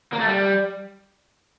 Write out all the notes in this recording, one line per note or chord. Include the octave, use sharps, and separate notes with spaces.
A#3
A3
G3